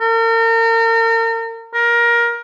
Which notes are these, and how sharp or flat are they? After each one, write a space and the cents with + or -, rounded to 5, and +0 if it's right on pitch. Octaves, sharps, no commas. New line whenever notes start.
A#4 -40
A#4 +20